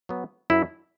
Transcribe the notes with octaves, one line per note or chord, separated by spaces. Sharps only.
F#3 B3
F#2 E4